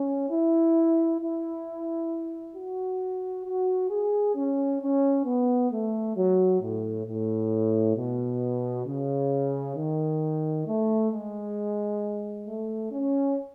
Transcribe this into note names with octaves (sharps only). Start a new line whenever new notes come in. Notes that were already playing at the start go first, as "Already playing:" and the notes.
Already playing: C#4
E4
E4
F#4
F#4
G#4
C#4
C#4
B3
A3
F#3
A2
A2
B2
C#3
D#3
A3
G#3
A3
C#4